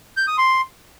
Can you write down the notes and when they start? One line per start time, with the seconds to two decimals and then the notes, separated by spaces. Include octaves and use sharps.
0.17 G6
0.27 D#6
0.38 C6